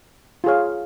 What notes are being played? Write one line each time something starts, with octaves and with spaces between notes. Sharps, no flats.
F4 G#4 C#5 F5